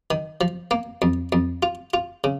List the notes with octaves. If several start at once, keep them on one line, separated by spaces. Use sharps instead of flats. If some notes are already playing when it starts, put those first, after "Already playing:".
D#3
F3
A#3
F2
F2
F4
F4
C#3